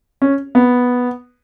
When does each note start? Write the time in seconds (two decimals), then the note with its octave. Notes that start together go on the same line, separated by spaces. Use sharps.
0.22 C#4
0.55 B3